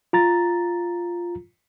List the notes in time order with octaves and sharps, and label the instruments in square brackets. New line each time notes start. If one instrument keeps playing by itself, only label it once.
[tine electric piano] F4 A#5 A6